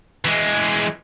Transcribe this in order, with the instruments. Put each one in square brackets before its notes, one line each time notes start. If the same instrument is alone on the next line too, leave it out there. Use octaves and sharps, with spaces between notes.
[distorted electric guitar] E3 G#3